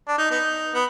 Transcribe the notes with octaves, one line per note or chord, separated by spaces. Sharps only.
D4
D#4
B3 D#4
B3